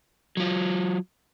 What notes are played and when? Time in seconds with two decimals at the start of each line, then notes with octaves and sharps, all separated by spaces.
0.37 F#3 F4